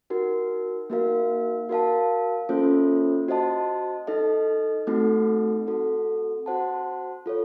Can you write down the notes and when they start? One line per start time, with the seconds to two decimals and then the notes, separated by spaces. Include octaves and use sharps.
0.10 D#4 F#4 A#4
0.90 A#3 D#4 F#4 A#4 F5
1.69 F#4 A#4 F5 A5
2.49 A#3 C#4 F4 A4 C5
3.28 F#4 C5 D#5 A5
4.07 D#4 A4 D#5
4.87 A3 C4 D#4 F#4 A4
5.67 C4 F#4 A4
6.46 F#4 C5 F#5 A5
7.26 F4 A4 C#5